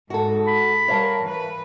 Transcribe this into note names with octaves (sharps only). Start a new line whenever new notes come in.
G#2 F#4 A4
B5
G3 A#4 C#5 F5 A5
E3 B4